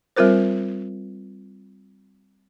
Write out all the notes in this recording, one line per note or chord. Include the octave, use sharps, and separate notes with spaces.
G3 C4 F4 A#4 C5